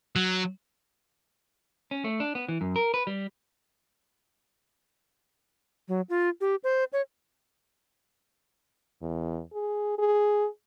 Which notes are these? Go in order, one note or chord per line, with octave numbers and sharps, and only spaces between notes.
F#3
C#4
A3
D4
B3
E3
F#2
A#4
B4
G3
F#3
F4
G4
C5
C#5
E2
G#4
G#4